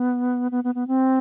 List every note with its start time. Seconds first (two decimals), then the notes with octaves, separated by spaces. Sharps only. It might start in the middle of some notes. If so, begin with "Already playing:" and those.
Already playing: B3
0.51 B3
0.64 B3
0.75 B3
0.88 C4